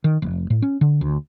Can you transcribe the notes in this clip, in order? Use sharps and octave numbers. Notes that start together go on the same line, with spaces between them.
D#3
F1
A2
C#4
D3
D2